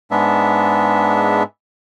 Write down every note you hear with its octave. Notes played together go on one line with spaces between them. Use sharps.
G#2 G#3 B3 D4 E5